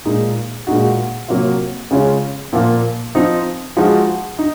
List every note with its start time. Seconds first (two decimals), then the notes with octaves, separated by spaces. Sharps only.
0.05 A#2 G#3 D#4
0.67 A#2 G#3 D#4 F#4
1.28 C3 F#3 A#3 F4
1.91 C#3 G#3 C#4 F4
2.53 A#2 F3 A#3 F4
3.15 F3 C4 D#4
3.77 F3 G#3 D#4 F#4
4.39 D#4